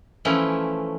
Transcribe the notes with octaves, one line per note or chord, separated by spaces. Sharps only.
E3 F3 A3 C#4 E4